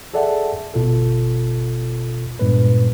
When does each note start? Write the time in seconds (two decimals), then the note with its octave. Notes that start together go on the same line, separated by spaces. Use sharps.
0.14 G#4 A4 D5 E5 F#5 A5
0.74 G1 B2 F4 A4
2.39 G2 A#2 G#3 B3 B4